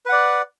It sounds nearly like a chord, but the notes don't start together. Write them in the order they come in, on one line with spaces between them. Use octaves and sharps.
B4 F#5 D5